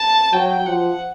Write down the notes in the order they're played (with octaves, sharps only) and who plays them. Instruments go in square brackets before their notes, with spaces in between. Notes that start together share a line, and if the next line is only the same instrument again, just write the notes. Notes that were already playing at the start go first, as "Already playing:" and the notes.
Already playing: [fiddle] A5
[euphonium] F#3 [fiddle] G5
[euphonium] F3 [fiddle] F#5